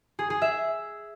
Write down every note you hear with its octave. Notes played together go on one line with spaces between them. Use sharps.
G#4
G#4
E5